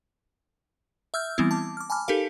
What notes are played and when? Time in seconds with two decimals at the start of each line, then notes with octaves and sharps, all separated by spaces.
1.14 E5 E6 F6 G6
1.38 E3 G3 B3 C4 E4
1.51 A5 D6
1.77 D6 F6
1.90 G#5 A5 B5 D6 F6
2.08 D#4 G4 A4 A#4 F5